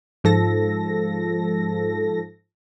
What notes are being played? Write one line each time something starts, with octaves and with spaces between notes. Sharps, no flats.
G#2 F3 A4 A#6